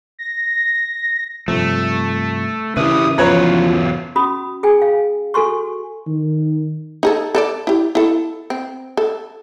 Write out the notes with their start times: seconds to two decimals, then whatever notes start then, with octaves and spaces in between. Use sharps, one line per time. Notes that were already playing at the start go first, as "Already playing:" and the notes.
0.19 A#6
1.48 G2 C3 F3 A3
2.77 C#3 E3 E4 G4 A#4 B4 D#6
3.18 E2 F3 F#3 F4 B4 C#5 A#5
4.15 C#4 F#4 B5 D#6
4.63 G#4 G5 G#5
4.82 F5
5.34 F#4 A4 G#5 C6 C#6
6.07 D#3
7.03 D#4 G#4 A4
7.35 A4 B4 D5
7.67 E4 G4
7.95 E4 A4
8.50 C4
8.97 A4